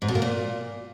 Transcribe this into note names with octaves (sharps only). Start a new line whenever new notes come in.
G#2
B2
A#3
A#2